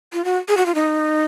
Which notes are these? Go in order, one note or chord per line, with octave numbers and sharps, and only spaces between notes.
F4
F#4
G#4
F#4
F4
D#4